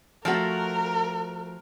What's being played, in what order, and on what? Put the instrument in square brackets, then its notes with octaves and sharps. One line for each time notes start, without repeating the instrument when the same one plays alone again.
[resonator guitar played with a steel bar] F3 A3 F#4 [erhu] A#4